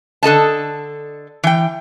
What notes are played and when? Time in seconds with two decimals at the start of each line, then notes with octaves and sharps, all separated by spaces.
0.23 D3 A4 D#5 A5
1.44 E3 G5